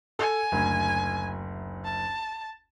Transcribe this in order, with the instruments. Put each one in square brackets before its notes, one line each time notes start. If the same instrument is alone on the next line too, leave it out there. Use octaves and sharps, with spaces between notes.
[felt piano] A4 [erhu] G#5
[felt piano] F#1 D2
[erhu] A5